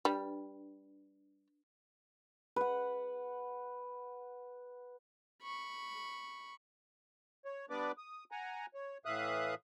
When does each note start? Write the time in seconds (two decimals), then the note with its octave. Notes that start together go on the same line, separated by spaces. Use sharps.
0.05 G3 D4 B4
2.56 B4 F#5
5.43 B5 C#6
7.45 C#5
7.70 G3 B3 D4 B4 D5 D6
7.98 D#6
8.31 F#5 G#5 A#5
8.74 C#5
9.05 A2 E3 E5 F5 D#6 F#6